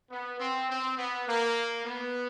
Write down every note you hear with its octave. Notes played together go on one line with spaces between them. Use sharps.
B3
C4
C4
B3
A#3
B3